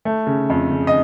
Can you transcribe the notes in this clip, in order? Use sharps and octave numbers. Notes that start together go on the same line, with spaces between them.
A3
C#3
F2
C#3
D#5